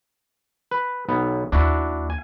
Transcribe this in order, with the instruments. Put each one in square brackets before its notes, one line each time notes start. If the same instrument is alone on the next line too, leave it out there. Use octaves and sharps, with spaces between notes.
[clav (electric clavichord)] B4
B1 B3
[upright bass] D#2 [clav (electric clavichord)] D4 E4 F#4
[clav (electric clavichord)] G#5